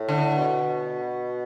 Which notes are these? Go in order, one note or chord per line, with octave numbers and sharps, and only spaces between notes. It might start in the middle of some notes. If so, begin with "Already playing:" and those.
Already playing: A2
D3
B2